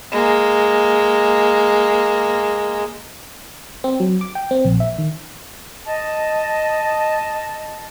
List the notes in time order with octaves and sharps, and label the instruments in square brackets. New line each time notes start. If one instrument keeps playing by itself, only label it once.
[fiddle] G#3 A#3
[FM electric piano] C4
F#3
D6
G5
C4
A#1
E5
D#3
[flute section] D#5 A5